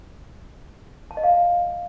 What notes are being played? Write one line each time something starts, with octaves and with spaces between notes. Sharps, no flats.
A5
D#5
F5